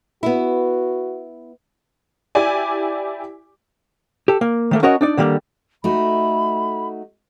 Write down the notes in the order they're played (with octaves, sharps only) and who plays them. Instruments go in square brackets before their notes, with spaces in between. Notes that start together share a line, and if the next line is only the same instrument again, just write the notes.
[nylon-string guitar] B3 E4 [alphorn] F#4
[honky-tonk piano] E4 G4 D5 G#5
[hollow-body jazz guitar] G4 A4
A#3
D#3 A3 A#3
C#4 F#4 A#4 C#5 D#5 F#5
D4 D#4 D5
D3 D#3 G3 G#3 A#3
[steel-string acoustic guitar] A3 D#4 F#4 [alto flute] B5